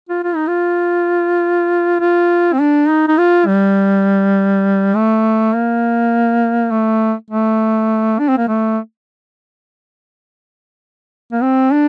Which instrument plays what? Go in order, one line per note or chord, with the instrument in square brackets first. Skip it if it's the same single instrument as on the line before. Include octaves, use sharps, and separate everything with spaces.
[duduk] F4
F4
D#4
F4
F4
C4
D4
D#4
D#4
F4
G3
A3
A#3
A3
A3
D4
C4
A#3
A3
A#3
C4
D4